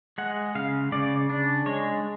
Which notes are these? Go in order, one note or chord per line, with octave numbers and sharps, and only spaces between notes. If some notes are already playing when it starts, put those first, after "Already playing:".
G#3 F#5
C#3 F5
C#3 D5
D4
G#3 C#5